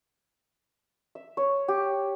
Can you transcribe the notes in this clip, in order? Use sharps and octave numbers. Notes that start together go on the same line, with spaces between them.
E5
C#5
G4